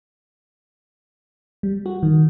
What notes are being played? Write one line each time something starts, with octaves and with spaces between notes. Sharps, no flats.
G3
F#4
D#3